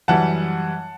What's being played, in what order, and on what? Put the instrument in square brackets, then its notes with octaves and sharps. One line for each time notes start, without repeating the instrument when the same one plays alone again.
[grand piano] F#2 E3 G3 F#5 A5